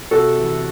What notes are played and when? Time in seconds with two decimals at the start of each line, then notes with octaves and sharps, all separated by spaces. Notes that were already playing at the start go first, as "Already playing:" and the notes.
0.11 C3 F#4 A4
0.38 E3